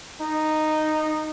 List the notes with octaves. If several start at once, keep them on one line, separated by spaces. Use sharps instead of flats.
D#4